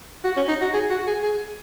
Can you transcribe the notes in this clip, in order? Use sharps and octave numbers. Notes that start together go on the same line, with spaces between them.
F#4
C#4
D#4
F#4
G#4
F#4
G#4
G#4